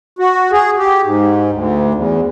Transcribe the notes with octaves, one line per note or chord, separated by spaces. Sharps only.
F#4
G#4
G4
G#2
D2
E2